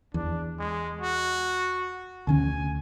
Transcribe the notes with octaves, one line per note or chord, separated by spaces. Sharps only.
E2 D4
G#3
F#4
D2 D3 C#4 G#5